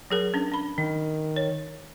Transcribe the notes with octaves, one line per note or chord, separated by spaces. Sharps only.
F#3 G#4 A#4
C#4 D4
D4 B5
D#3 D#4
C#5